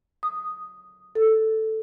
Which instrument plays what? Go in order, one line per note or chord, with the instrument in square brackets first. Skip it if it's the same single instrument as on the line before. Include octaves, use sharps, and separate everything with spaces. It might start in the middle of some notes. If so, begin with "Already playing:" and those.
[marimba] D#6
A4